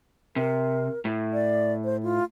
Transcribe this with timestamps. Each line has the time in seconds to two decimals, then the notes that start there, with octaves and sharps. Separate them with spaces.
0.36 C3 A#4
1.05 A2
1.33 D5
1.84 C5
2.03 F4